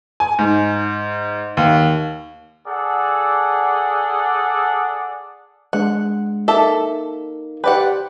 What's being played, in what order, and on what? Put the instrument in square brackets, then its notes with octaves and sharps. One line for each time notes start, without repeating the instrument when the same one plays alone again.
[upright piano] G#5
G#2
D#2
[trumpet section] G#4 A4 D5 F#5
[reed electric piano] G#3 D4 [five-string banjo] F#5
[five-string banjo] A#3 A4 E5 [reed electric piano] D#4 A#4
[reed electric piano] G4 C5 G5 [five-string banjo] B4 D5 F#5